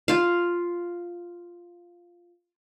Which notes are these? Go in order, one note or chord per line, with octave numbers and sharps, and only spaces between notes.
F4 F5